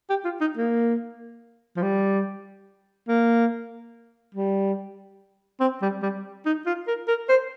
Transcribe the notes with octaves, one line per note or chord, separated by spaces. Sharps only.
G4
F4
D#4
A#3
F3
G3
A#3
G3
C4
G3
G3
D#4
F4
A#4
A#4
C5